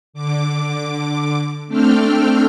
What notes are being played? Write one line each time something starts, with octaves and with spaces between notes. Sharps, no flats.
D3 D6
A3 C4 D4 A4 G5 F6